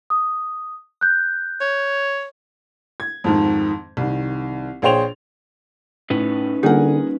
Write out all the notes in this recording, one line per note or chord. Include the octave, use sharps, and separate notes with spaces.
D#6
F#6 G6
C#5
G#6
F2 G#2 D#3
C2 D#3
A#1 G#4 C5 C#5 G5 F7
A2 C#4 D#4 B4
D3 G3 A#3 F4 G#4 A#4 F#5